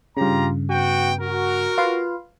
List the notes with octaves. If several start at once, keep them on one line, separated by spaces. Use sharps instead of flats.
G2 C#3 F4 G4 A#5
B3 F#4 G5
F#4 A#4
F4 B4 F5